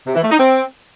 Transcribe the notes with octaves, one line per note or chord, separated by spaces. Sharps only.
C3
E3
A3
D#4
C4